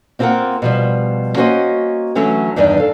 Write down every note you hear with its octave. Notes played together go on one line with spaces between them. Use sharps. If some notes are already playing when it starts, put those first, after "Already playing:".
A#3 C4 F4 G#4 A#4 F#5
B2 F3 G3
A#3 C#4 F#4 A#4 C5 D#5
D3 E3 F#3 A3 C#4 C#5
E2 G2 D#3 D4 D#4
A4 F5